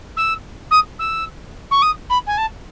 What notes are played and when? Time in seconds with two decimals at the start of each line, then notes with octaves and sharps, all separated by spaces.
0.16 E6
0.70 D#6
0.99 E6
1.71 C#6
1.82 D#6
2.09 B5
2.26 G#5
2.37 A5